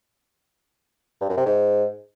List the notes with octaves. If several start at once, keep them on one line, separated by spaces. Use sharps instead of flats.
G2
F#2
C3
G#2